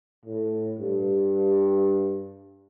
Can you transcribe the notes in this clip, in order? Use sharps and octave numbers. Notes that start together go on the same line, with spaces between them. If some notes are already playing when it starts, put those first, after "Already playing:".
A2
G2